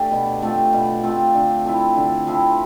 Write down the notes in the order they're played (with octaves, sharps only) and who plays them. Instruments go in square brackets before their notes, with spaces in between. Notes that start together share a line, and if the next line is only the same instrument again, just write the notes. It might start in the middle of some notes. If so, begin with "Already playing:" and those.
Already playing: [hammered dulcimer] A3 D4 G4
B2
A3 C4 F4
B2
A3 C4 F4
D3
F3 C4 E4
D3
F3 C4 E4